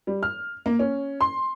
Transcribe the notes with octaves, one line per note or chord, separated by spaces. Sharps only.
G3
F6
A#3
C#4
C6